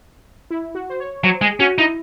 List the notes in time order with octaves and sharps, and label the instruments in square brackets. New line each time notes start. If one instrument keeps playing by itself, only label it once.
[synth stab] E4
F#4
C5
C#5
[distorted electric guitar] F#3 [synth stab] C5
[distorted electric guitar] G#3 [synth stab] G#4
[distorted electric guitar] C#4 [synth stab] F#4
[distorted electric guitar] D#4 [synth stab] E4